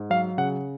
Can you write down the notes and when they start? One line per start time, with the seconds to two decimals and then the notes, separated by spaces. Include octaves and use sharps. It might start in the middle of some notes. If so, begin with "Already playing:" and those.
Already playing: G#2
0.10 F#3 F5
0.38 C#3 F#5